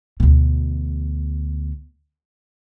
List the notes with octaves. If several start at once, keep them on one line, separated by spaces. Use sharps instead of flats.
D2 B2